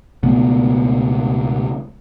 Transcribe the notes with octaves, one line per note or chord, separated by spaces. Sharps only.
C#2 B2 A3 B3